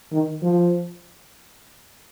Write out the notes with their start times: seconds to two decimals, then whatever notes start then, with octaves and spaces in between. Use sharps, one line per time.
0.12 D#3
0.43 F3